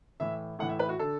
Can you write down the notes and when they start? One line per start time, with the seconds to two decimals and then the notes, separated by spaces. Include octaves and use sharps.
0.20 A2 E3 E5
0.59 A2 E3 F#5
0.69 E5
0.79 B4
0.89 F#4
0.99 D3 A4